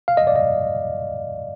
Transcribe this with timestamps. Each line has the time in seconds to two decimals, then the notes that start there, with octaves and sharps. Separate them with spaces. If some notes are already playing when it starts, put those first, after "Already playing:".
0.08 F5
0.17 D#5
0.27 D5
0.36 D#5